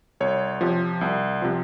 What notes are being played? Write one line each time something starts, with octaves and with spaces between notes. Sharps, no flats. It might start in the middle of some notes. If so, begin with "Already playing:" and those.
C2 C#5
C3 F3
C2
C3 F3